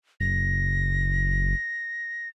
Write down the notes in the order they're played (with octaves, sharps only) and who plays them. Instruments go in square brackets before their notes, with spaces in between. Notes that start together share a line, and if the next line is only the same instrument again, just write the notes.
[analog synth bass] F#1 [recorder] A#6